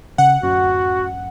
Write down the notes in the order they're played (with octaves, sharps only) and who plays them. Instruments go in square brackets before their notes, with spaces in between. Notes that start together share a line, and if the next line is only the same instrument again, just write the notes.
[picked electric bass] C#3 [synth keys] F#5
[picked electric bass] D1 F#2 C#4 [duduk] F#4